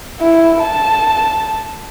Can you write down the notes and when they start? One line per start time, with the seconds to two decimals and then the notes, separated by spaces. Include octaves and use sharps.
0.20 E4
0.60 A5